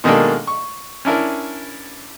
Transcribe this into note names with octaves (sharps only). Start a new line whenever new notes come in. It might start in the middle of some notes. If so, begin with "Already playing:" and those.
B2 D#3 G#3 A#3 D4 A4
C#6
C#4 D4 E4 A#4